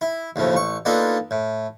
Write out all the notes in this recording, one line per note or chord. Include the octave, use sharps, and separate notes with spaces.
E4
D#2 A2 C#3 F3
A1 C#6
A#3 B3 D4 D#4 F4 A4
A2